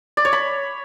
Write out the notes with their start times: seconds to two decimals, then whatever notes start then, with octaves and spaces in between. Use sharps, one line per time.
0.17 D5
0.25 C#5
0.33 B5